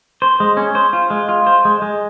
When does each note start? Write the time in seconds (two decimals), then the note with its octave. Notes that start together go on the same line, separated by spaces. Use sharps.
0.22 C5
0.40 G#3
0.57 C#4
0.75 C5
0.93 F4
1.10 G#3
1.29 F4
1.47 C5
1.65 G#3
1.82 G#3